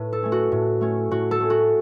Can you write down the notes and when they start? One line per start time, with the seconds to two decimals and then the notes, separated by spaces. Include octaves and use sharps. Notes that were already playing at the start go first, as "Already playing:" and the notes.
Already playing: A2 B4
0.13 A4
0.23 A3 C#4
0.32 F#4
0.52 A2
0.81 A3 C#4
1.11 A2 F#4
1.31 A4
1.40 A3 C#4
1.50 F#4